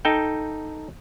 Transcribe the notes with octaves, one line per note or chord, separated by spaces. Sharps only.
D#4 A4 G5